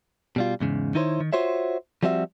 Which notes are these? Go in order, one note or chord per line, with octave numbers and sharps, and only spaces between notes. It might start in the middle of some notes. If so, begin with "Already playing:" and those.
B2 G3 F4
E2 G#2 C#3
D#3 D#4 E4 A#4 C5 C#5
D#3
F4 F#4 C5 C#5 E5
F3 G3 C4 F#4 E5